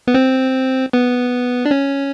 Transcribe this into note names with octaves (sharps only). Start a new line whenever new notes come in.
B3
C4
B3
D4
C#4